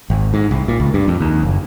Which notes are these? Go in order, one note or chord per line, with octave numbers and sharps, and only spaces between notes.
G#1
G#2
C2
A#2
C#2
G2
F2
D#2
F#1